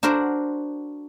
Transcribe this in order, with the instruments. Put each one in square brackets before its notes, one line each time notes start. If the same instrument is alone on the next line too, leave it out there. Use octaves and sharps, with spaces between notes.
[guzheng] D4 F#4 A#4 C5